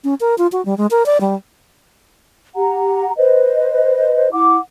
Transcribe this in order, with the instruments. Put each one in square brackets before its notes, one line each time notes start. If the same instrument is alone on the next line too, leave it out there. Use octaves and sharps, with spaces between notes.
[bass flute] C#4
A#4
F4
F#4
G3
G#3
A#4
D5
G3
[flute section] G4 F#5 A#5
B4 C5 D#5
E4 F#5 D6